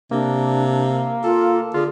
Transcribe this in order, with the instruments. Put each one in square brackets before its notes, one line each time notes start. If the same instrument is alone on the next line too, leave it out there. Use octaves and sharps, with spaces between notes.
[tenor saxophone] C3 [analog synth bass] A#3 [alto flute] D4
[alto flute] F4 [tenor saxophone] A4
[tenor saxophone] D3 [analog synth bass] F4 [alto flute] G#4